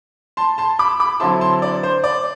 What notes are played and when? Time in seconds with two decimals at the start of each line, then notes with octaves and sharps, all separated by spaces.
0.37 A5 C6
0.58 A5 C6
0.79 B5 D6
1.00 B5 D6
1.20 D3 F#3 C4 E4 A5 C6
1.41 A5 C6
1.62 D5
1.83 C5
2.04 D5